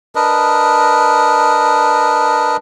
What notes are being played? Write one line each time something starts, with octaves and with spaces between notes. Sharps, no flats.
D4 A#4 B4 D#5